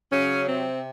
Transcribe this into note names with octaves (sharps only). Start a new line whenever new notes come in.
C#3 F#3 C#4
C3 C4